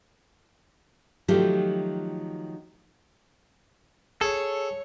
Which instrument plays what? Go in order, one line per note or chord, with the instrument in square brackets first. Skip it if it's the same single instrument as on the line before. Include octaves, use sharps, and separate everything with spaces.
[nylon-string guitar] D#3 F3 F#3 A3 F4 G4
[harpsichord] G#4 [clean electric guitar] A4 [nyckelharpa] C#5